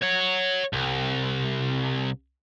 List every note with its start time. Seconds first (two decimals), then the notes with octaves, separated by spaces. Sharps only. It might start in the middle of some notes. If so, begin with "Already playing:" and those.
0.03 C#5 F#5
0.73 C2